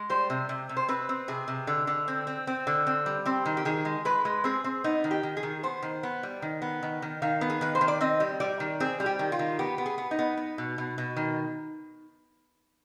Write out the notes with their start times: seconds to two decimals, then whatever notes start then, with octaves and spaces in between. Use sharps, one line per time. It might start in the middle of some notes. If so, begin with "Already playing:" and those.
Already playing: G#3
0.10 G3 C5
0.30 C3
0.49 C3
0.69 C3
0.77 C5
0.88 C4 B4
1.09 C4
1.28 C3 G#4
1.48 C3
1.67 D3
1.87 D3
2.08 C4
2.27 C4
2.47 C4
2.67 D3
2.87 C4
3.06 G3
3.26 C4 G4
3.45 D#3
3.57 G4
3.65 D#3 G#4
3.85 G#3
4.05 G#3 B4
4.25 G#3
4.44 C4 G#4
4.64 C4
4.84 B3 D#4
5.04 D#3
5.11 G4
5.23 D#3
5.37 G#4
5.43 D#3
5.63 B3 C5
5.82 D#3
6.03 B3
6.23 G3
6.42 D#3
6.62 B3
6.83 D#3
7.02 D#3
7.22 D#3 F5
7.41 B3
7.50 G#4
7.61 D#3 B4
7.75 C5
7.81 D#3
7.88 D5
8.01 C4 D#5
8.20 G3
8.40 G3 D5
8.60 D#3
8.80 C4 G#4
9.00 G3
9.06 G4
9.19 D#3
9.32 F4
9.39 D#3
9.59 B3 G4
9.78 B3
9.86 G#4
9.98 B3
10.11 D#4
10.19 B3
10.37 B3
10.58 B2
10.78 B2
10.98 B2
11.16 D#3